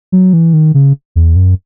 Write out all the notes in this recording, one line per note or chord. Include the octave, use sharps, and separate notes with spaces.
F#3
E3
D#3
C#3
E2
F#2